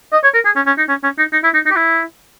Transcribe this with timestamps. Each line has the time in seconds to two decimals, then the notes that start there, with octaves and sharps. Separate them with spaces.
0.12 D#5
0.23 C#5
0.34 A#4
0.45 G#4
0.56 C#4
0.67 C#4
0.78 D#4
0.89 C#4
1.03 C#4
1.18 D#4
1.32 D#4
1.44 E4
1.54 D#4
1.65 D#4
1.71 G4
1.76 E4